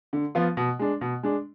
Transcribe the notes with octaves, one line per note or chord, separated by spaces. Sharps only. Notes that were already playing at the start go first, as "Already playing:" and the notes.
D3
F3 B3 F4
B2
G#3 D4
B2
G#3 D4